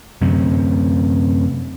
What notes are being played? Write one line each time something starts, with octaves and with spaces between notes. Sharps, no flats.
F#2 C3